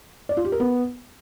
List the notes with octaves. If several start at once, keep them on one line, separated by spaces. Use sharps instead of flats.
D5
F4
G4
A#4
B3